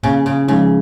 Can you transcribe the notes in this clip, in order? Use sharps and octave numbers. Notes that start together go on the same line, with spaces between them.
A#2 C#3
C#3
C#3 F3 G#3 D#4